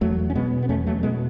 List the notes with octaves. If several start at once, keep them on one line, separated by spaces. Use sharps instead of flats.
E2 F#3 A3
C#4
B2 G#3 B3
B3
E2 A3 C#4
F#3 A3
B2 G#3 B3